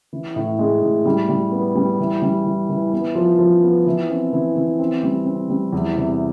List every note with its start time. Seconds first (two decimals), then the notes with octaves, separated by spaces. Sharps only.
0.13 E3
0.36 A2
0.59 G#3
0.83 A2
1.05 G3
1.29 G3
1.52 B3
1.75 G3
1.99 E3
2.22 G3
2.46 E3
2.70 E3
2.93 B3
3.15 F3
3.39 F3
3.63 B3
3.86 E3
4.10 C4
4.33 E3
4.56 E3
4.79 C4
5.03 G3
5.26 C4
5.50 G3
5.72 E2
5.96 C3